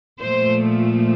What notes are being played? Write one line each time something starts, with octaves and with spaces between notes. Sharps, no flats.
A#2 F3 A3 C5